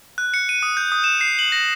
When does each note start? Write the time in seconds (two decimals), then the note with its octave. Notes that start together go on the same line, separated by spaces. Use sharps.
0.18 F#6
0.34 C#7
0.49 D#7
0.63 D#6
0.77 G6
0.92 D#6
1.04 E7
1.21 C7
1.39 F#7
1.52 A#6